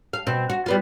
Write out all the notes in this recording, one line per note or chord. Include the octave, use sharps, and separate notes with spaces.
F5
B2 C4
F#4
G3 B3 F4